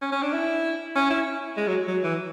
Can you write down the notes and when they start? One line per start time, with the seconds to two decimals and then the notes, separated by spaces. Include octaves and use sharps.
0.02 C#4
0.12 C#4
0.22 D4
0.33 E4
0.95 C#4
1.10 E4
1.57 G#3
1.67 F#3
1.88 F#3
2.03 E3